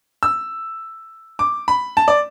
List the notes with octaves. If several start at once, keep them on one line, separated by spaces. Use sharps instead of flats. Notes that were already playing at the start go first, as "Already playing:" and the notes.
E6
D6
B5
A5
D5